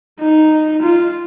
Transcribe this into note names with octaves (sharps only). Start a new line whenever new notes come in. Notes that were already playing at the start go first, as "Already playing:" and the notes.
D#4
F4